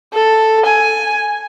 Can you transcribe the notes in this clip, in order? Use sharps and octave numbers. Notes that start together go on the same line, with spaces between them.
A4
G#5